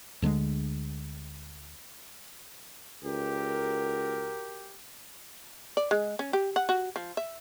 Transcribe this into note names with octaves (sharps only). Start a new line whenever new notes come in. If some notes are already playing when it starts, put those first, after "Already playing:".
D2 D3 G3 G#3
C#2 F#4 G4 A#4
D5
G#3
C#4
G4
F#5
F#4
F3
E5